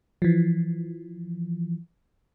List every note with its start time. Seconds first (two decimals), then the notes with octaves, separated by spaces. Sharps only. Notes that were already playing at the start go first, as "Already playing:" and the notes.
0.22 E3 F3